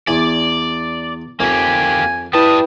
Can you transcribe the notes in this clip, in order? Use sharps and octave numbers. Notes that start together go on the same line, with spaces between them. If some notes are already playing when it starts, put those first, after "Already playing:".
E2 D5 G#5
F2 A#3 G4 G#5
G3 E4 B4 G5 A5 D#6